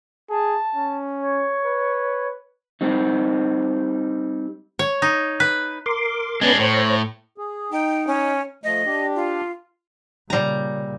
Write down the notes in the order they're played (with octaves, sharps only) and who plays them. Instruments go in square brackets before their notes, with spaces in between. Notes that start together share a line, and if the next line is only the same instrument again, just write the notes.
[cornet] G#4 [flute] A5
[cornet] C#4
[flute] C#5
[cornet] B4
[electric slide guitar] G3 C4 D#4
[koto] C#5
D#4
B4
[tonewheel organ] A#4 C6 D6
[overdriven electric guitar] G#3 D4 [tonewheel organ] B3 C#4 B4
[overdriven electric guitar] A2 [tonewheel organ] C5 C#5 A#5
[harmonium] G#4
[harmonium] D#4 [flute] G5
[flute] C#4
[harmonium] F3 A3 [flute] D#5
[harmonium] D4 G4
[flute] F4
[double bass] A#2 C#3 [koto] G3 A#5